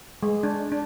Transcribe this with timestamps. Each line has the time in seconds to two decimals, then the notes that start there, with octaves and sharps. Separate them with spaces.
0.23 G#3
0.43 D4
0.72 D4